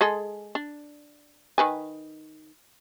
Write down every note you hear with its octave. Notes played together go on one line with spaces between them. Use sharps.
G#3 G#4 A4
D4
D#3 B4 G#5